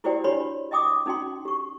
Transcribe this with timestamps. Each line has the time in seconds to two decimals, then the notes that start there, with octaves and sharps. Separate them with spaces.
0.04 E4 F#4 G4 C5 D5 G5
0.24 D4 F#4 G4 C#5 B5 C6
0.71 D#5 E5 G5 D6 D#6
1.06 C#4 D#4 F#4 G5 C6
1.45 G4 C#6